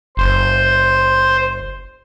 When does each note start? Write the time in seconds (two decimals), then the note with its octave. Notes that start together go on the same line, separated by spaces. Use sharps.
0.17 F#1 C5